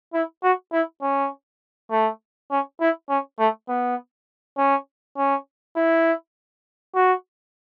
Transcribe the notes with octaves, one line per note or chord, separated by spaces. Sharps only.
E4
F#4
E4
C#4
A3
C#4
E4
C#4
A3
B3
C#4
C#4
E4
F#4